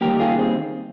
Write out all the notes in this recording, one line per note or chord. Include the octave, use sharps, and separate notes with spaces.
D#3 G3 A#3 G4 A#4
F4 G#4
C4